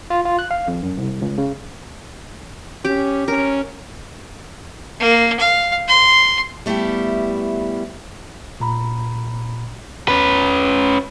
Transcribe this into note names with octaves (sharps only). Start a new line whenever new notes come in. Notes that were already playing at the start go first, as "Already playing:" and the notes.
F4
F4
F#6
F5
F2
F#2
C2
C#2
C#3
C#4 G4
C#4 A#4
A#3
F5
C6
G3 A3 B3 E4 G4
A#2 A#5 B5
E2 C#4 B4